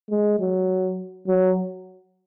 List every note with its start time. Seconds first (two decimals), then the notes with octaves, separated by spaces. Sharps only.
0.10 G#3
0.40 F#3
1.27 F#3